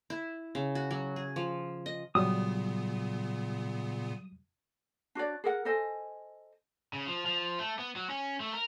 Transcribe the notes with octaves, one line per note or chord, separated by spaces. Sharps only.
E4
C#3
F#4
F#3
G#4
F3
D#5
A#2 C#3 F#3 G3 B3 D#6
D4 F#4 C#5 D5
G#4 A#4 F#5
A4 C5 D#5 G#5
C#3
F3
F3
A3
B3
F#3
C#4
A3
A#4